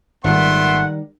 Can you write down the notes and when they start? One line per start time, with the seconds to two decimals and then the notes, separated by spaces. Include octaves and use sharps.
0.24 G#1 A#2 D#3 G3 A3 B3 F#5 C6